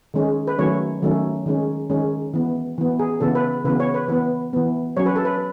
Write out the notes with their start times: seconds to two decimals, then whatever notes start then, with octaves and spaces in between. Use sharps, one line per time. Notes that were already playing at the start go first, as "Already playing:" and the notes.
0.14 D#3 G#3 C#4
0.47 B4
0.58 D#3 F#3 A3 C#4 C#5
1.02 D#3 F#3 A3 C#4
1.46 D#3 G#3 C#4
1.90 D#3 G#3 C#4
2.34 E3 B3
2.78 E3 B3
2.99 G#4
3.21 C#3 E3 B3 A4
3.35 B4
3.65 C#3 E3 B3 B4
3.80 C#5
3.94 B4
4.08 E3 B3 B4
4.53 E3 B3
4.97 F#3 C#4 C#5
5.06 B4
5.16 A4
5.25 B4